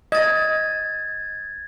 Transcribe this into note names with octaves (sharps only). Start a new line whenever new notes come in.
D#5 G#6 A6